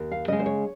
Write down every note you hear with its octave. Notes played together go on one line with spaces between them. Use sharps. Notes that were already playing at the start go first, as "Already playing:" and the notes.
Already playing: D#2
F5
C#3 G#3 D#5
C5
C#5